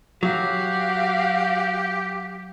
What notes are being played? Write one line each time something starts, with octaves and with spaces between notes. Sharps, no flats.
F#3 F#4 G4 F5